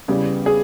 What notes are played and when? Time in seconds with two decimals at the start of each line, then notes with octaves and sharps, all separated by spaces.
0.08 E2 C#3 G3 B3
0.46 G#4